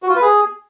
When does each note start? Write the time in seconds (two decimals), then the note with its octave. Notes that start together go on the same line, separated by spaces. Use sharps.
0.03 F#4
0.09 F4
0.16 B4
0.22 G#4